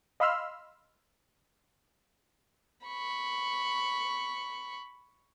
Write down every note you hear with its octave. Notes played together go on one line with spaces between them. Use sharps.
D#5 F5 B5 C6 E6 F6
B5 C#6